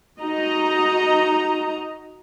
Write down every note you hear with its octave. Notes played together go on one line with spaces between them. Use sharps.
D#4 F#4 D#5 A#5